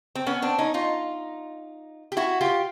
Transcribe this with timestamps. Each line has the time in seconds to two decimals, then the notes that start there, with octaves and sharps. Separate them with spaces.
0.15 C4
0.26 B3 C#4
0.42 C4 D4
0.58 C#4 D#4
0.74 D#4 F4
2.12 G4
2.17 E4 F#4
2.41 F4 G4